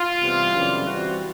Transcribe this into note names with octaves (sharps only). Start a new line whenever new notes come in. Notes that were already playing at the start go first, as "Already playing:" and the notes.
Already playing: F4
C3 E3 G3 B3
F#2 C#3 E3 G3 C4
E3 G3 C4 F#4